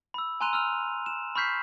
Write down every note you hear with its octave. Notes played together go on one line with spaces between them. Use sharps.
B5 E6
G#5 A#5 C6 F#6 D#7 F7
E6 F6 F7
E7
B5 C#6 F6 G6 B6 C7